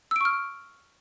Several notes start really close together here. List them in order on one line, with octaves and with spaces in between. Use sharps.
E6 D7 C#6 F6